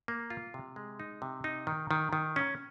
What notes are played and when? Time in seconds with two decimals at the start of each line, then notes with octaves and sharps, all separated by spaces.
0.08 A#3
0.30 F4
0.54 C3
0.76 G#3
1.00 D#4
1.22 C3
1.44 D#4
1.67 D#3
1.91 D#3
2.13 D#3
2.36 C#4